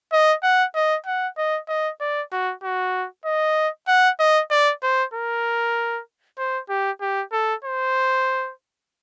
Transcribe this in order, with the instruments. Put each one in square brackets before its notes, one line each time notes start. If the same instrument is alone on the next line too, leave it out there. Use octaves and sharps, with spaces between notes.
[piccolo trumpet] D#5
F#5
D#5
F#5
D#5
D#5
D5
F#4
F#4
D#5
F#5
D#5
D5
C5
A#4
C5
G4
G4
A4
C5